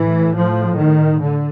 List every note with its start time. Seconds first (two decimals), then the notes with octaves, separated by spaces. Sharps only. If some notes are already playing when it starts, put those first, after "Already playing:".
Already playing: A2 E3
0.35 F3
0.77 D#3
1.20 D3